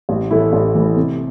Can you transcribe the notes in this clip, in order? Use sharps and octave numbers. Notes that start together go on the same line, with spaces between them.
A1
A2 E3 A3 E4
A1
A2 E3 A3 E4
C3